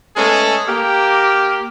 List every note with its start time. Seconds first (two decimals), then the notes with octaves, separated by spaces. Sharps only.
0.17 G#3 A3 B3 C#4 G#4 A4
0.68 A#3 G4